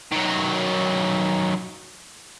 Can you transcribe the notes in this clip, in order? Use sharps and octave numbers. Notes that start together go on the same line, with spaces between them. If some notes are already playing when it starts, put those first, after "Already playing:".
D#3 F#3